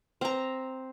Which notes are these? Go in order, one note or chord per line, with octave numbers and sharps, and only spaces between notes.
C4 A#5